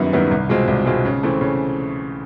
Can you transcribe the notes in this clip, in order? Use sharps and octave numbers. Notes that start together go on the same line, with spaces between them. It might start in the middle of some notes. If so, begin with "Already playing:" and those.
Already playing: F#2 D#3 G3 B3 E4
D#3 G3 B3 E4
C2
B2 G#3 C4 F4
C2
B2 G#3 C4 F4
C#3
E3 A3 C4
C#3